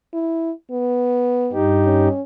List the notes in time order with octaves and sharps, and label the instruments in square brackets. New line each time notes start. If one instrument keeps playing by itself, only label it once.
[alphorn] E4
B3
[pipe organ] G2 D#4 G4
[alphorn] C#4